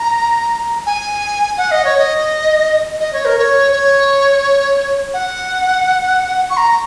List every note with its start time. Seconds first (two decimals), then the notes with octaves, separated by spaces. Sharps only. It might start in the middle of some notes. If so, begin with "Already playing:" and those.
Already playing: A#5
0.86 G#5
1.57 F#5
1.71 D#5
1.85 C#5
1.97 D#5
3.00 D#5
3.13 C#5
3.25 A#4
3.39 C#5
3.72 C#5
5.14 F#5
6.50 C#6
6.57 A#5